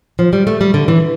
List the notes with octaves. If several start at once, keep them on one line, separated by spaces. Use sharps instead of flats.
F3
G3
A3
G3
D3
E3